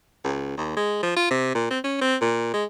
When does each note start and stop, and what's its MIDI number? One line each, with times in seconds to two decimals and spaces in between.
0.24 0.53 37
0.57 0.74 39
0.77 1.03 56
1.03 1.15 53
1.16 1.26 65
1.31 1.51 48
1.55 1.66 46
1.70 1.79 60
1.84 1.98 61
2.01 2.16 60
2.21 2.54 46
2.54 2.65 56